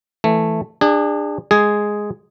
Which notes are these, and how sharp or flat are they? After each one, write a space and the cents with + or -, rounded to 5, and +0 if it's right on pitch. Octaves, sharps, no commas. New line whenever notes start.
E3 +0 A3 +0
D4 +20 G#4 -30
G#3 +0 G#4 +0